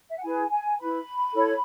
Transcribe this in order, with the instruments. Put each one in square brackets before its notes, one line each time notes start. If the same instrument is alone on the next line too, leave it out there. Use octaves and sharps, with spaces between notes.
[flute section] E5
F#5
E4 G#4 B4 G#5
G#5
E4 B4 B5
E4 A4 C#5